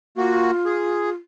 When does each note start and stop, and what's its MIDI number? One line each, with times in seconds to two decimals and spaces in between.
0.18 0.51 58
0.18 1.14 65
0.18 0.51 66
0.66 1.10 68